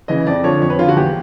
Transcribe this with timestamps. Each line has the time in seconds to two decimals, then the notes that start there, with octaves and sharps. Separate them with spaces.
0.08 C#3 E3 D#5
0.27 F2 D5
0.44 D3 F3 C#5
0.61 F2 C#5
0.70 B4
0.79 D3 F3 F4
0.88 F#4
0.96 E2 G4